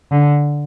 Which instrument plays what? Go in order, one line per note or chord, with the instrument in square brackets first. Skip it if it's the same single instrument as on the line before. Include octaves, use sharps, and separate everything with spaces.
[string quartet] D3